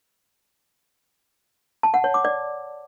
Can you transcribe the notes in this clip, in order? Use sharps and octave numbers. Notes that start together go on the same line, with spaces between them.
A5
F#5
C#5
D6
D5